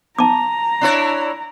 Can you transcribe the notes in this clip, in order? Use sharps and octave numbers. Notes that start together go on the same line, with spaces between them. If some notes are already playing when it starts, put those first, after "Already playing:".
A5 A#5 D6
D4 E4 C#5